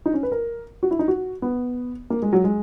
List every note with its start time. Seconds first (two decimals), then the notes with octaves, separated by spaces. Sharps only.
0.06 D#4
0.14 C#4
0.23 B4
0.32 A#4
0.83 F#4
0.91 E4
0.99 D#4
1.08 F#4
1.42 B3
2.10 A#3
2.22 G#3
2.33 F#3
2.44 G#3